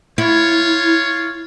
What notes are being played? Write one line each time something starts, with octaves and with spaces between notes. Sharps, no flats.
E4 F4 C#5